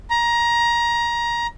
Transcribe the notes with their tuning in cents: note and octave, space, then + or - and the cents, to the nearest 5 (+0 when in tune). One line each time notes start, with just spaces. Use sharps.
A#5 +20